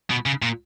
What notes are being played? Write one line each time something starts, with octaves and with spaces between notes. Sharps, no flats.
B2
C#3
A#2